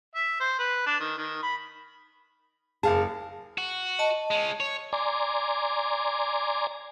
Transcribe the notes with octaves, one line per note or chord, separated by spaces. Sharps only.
E5
C5
B4
D4
D#3
D#3
B5
F#1 G#4 F5 A5
F#4
D#5 A5
G#3 C#4
C#5
D5 G#5 A#5 C6 D6